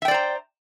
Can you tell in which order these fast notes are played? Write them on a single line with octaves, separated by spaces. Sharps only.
E5 G5 D5 C5 A#5